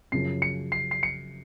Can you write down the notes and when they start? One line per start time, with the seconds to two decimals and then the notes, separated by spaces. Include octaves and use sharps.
0.12 F#2 C#3 F3 C7
0.42 C#7
0.72 C7
0.91 C7
1.03 C#7